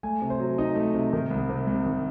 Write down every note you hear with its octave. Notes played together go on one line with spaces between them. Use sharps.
A3 G#5
C3
C5
F#3
D#4 D#5
A3
C3
D#3
C2
C3
C2
D#3